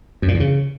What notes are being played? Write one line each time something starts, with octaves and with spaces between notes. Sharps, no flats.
F#2
A#2
E2
C#3